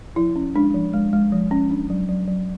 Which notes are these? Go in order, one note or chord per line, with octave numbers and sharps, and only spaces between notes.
F3 E4
C#4
G#3 D4
F3
G#3
G#3
F3
C#4
D4
F#3
F#3
F#3